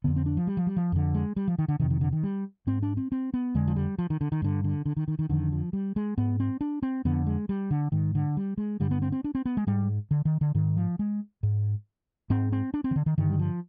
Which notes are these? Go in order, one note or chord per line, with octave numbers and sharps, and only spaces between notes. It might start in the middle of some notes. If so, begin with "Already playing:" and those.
F2 D3 B3
C4
D4
F3
G3
F3
G3
F3
F2 D3
G#3
G3
F3
D#3
D3
F2 C3 D#3
D#3
D3
D#3
G3
G#2 C4
D4
C4
C4
B3
F2 D3 G#3
F3
G3
F3
D#3
D3
D#3
G2 D3
D3
D3
D#3
D#3
D#3
F2 D3 D#3
F3
G3
G#3
G#2 B3
C4
D4
C4
F2 D3 B3
G#3
G3
D3
G#2 D#3
D3
G3
G#3
G2 D3 G3
B3
C4
C4
D4
C4
B3
G#3
G#2 G3
D3
D#3
D3
G#2 D#3
F3
G#3
G#2
G#2 C4
C4
D4
C4
D#3
D3
D#3
G2 D3 D#3
G3
F3